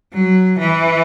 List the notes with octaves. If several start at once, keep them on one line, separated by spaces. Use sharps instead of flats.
F#3
E3